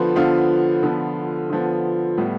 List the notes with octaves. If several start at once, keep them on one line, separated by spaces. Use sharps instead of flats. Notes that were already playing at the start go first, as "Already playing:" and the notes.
Already playing: D3 F3 B3 B4 C5
D3 F3 B3 F5
D3 F3 B3
D3 F3 B3
A2 G3 B3